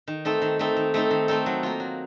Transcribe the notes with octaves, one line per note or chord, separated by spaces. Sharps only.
D#3
A3 C4 D#4 A4
D#3
A3 C4 D#4 A4
D#3
A3 C4 D#4 A4
D#3
A3 C4 D#4 A4
F#3
A#3 F4
F#3